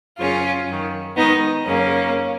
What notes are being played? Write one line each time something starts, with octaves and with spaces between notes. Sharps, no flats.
F#2 C#3 C#4 F4
F#2 D#3
G#2 D#3 B3 D#4
F#2 C#3 A#3 C#4